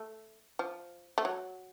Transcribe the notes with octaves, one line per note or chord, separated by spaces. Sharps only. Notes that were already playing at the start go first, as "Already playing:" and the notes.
Already playing: A3
F3
A3
F#3